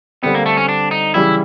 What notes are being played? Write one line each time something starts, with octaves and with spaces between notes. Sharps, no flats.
D3 G3 B3 C4
A#3
A3
C#4
D4
D#4
C#3 E3 G3 E4